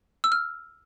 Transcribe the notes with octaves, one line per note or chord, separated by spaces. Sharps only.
E6
F6